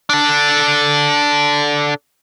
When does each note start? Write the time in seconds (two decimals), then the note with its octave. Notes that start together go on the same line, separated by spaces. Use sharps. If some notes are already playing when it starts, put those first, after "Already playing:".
0.10 D4 A4